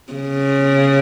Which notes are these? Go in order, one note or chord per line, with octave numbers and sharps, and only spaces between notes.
C#3